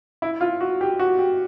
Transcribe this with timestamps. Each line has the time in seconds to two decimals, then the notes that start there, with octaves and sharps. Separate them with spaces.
0.22 E4
0.41 F4
0.61 F#4
0.81 G4
0.99 F#4
1.19 G4